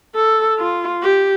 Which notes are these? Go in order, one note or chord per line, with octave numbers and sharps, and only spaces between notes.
A4
F4
G4